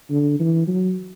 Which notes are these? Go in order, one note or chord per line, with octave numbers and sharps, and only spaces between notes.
D3
E3
F#3